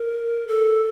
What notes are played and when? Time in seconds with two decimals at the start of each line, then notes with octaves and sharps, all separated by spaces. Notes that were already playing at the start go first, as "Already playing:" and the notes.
Already playing: A#4
0.48 A4